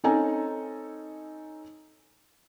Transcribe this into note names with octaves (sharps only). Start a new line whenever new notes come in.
C4 C#4 D#4 A4 G#5 A#5